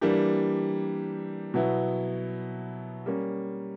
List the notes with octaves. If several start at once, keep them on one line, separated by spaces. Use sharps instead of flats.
E3 G3 A#3 D4 G4
B2 F#3 B3 E4
G3 A#3 C#4